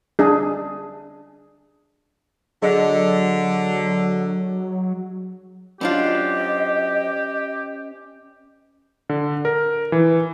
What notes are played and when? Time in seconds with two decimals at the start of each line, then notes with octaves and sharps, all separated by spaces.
0.19 D4 G#4
2.62 D3 F#3 G#4 D#5
5.81 F#3 C#4 D4 F4 G4 C5 D5 D#5
9.09 D3
9.45 A#4
9.92 E3